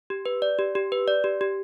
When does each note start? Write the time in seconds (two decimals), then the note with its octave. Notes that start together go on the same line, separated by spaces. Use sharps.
0.10 G4
0.26 B4
0.42 D5
0.59 G4
0.75 G4
0.92 B4
1.08 D5
1.24 G4
1.41 G4